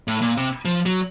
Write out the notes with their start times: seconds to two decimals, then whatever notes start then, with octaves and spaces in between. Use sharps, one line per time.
0.08 A2
0.22 A#2
0.37 C3
0.65 F3
0.86 F#3